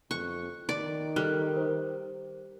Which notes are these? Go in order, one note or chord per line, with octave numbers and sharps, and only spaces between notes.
F2 C#6 F#6
D#3 D5
G3 A4 F6 F#6
A#4 C5